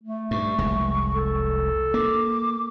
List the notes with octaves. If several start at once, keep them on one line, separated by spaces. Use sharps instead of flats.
A3
G2 C#6
F1 C2 G#3
A4
A#3 D6